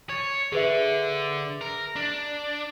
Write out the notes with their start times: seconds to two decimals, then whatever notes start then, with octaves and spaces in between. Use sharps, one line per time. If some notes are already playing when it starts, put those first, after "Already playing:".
0.09 C#5 G#6 A6 D#7
0.52 D3 G#4 B4 E5
1.61 A#4
1.96 D4